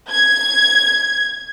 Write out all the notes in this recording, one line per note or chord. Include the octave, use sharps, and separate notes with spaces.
G#6